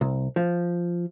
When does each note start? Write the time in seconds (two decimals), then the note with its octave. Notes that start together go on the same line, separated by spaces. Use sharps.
0.01 C2
0.36 F3